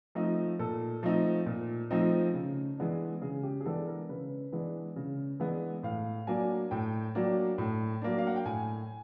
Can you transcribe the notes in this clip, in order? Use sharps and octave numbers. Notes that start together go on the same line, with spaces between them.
F3 A3 C4 D#4
A#2 A4
F3 A3 C4 D#4
A#2
F3 A3 C4 D#4
C#3
E3 G#3 B3 D4
C#3 G#4
G4
G#4
E3 G#3 B3 D4 A4
A#4
C#3 B4
E3 G#3 B3 D4
C#3
E3 G#3 B3 D4
A2 F5
F#3 A#3 D4 G#5
A2 G5
F#3 A#3 D4
A2
F#3 A#3 D4
F5
F#5
G5
A2 G#5